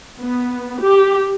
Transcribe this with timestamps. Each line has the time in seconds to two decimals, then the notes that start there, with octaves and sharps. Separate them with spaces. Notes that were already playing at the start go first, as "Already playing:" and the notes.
0.22 B3
0.82 G4